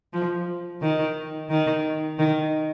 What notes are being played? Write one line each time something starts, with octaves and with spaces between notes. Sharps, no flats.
F3
D#3
D#3
D#3